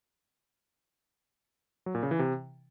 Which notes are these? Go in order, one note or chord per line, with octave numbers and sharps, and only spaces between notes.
F#3
A#2
C#3
E3
C3